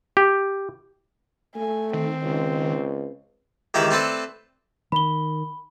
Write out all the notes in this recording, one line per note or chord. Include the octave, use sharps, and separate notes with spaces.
G4
A3 G#5
D#3 C4
C#2
C#2 D#3 E3 E4 G4 E5
A3 C4 A4 B4 D5
D#3 B5 G7